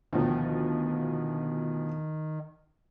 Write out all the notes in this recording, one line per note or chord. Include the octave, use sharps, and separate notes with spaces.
D2 B2 D#3 F3